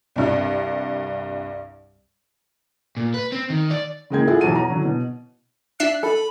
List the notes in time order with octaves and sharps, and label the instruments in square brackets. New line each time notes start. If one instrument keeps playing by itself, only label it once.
[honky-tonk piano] C2 G2
[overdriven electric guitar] A#2
B4
C4
D#3
D5
[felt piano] C#3 E3 G#3 A#3 G5 G#6
E4 F4 G#4 A4 E5 F#5
B1 E2 F#3 F#4 A5 D#7
A#5
D3 E3 F#3
B2
[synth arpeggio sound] D4 E5 C7 [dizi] F#6
[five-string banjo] A4 [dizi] B5